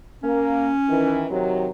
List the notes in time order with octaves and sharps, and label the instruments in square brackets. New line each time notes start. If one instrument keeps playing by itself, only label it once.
[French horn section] A#3 [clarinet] C#4
[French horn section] D#3 E3
C3 D#3 F#3